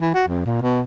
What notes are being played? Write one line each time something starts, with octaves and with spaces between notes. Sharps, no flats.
E3
F#4
F2
A#2
B2